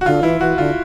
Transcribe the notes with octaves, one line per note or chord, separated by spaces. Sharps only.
F#4
D3 F4
E3 E4
E3 F#4
D3 F4